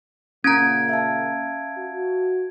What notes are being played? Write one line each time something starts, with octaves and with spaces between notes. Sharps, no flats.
A#2 C#3 A#3 C#4 A#5 G#6 D7
E5 F5 A5
F#4